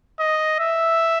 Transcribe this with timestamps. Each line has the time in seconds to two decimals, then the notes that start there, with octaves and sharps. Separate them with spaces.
0.20 D#5
0.59 E5